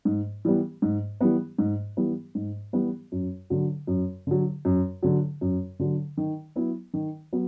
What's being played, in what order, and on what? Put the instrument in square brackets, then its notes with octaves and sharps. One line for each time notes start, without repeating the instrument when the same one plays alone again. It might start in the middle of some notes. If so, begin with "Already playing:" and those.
[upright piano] G#2
E3 G3 B3
G#2
E3 G3 B3
G#2
E3 G3 B3
G#2
E3 G3 B3
F#2
D3 F#3
F#2
D3 F#3
F#2
D3 F#3
F#2
D3 F#3
D#3
F#3 B3 E4
D#3
F#3 B3